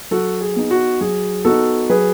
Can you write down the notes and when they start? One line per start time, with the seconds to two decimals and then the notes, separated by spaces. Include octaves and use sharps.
0.11 F#3 F#4 A4
0.41 G#4
0.56 B3 D#4
0.71 F#4
1.01 F#3 G#4
1.45 B3 D#4 F#4 A4
1.89 F#3 G#4 B4